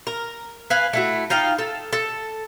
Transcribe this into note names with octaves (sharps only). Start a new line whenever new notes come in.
A#4
B4 F5 G#5
A3 E4 F#4
D#4 F4 F5 G5
A4
A4